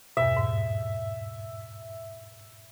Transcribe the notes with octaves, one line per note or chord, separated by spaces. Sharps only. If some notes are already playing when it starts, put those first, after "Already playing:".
E2 G2 B2 E5
G#2